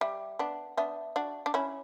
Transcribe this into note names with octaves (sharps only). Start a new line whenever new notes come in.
G3 E5
B3 D4 F#5
B3 D4 E5
D4 F#4
D4
C#4 E4 C#5